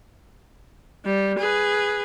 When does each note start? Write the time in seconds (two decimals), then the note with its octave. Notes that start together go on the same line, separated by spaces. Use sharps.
1.05 G3
1.38 G#4 B4